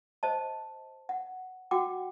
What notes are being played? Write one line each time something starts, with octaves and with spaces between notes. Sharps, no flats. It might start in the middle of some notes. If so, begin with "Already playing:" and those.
C5 D#5 A5
F#5
F#4 F#5 G5 D6